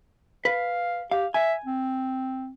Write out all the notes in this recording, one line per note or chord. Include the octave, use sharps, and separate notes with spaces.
B4 F5
G4 F5
E5 G#5
C4